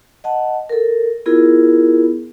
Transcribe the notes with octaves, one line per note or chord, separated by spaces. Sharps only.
D#5 F#5 A5
A4 A#4
B3 E4 F4 G#4 A#4